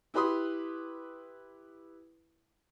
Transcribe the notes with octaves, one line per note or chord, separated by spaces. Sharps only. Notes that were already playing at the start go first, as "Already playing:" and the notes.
E4 G4 B4 B5 C6 D#6